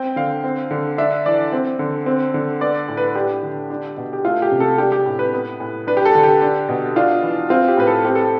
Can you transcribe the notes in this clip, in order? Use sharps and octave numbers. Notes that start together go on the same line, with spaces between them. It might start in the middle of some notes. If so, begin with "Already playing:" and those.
Already playing: C4 G5
D3 F5
C4
D3
D4 E5
E3 D5
C4
D3
C4
D3
B3 D5
A2
B4
D4 G4
D3
D4
B2
G4
A3 F4
G4
C3
A4
D4 G4
G4
A2
B4
B3
A2
D4 B4
G4
A4
D3
G4
D4
B2
D4 F4
E3
C4 F4
G4
A2 B4
A4
C4 G4
A4